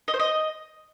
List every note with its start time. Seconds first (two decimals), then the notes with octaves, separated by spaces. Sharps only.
0.08 D#5
0.14 C5
0.20 D#5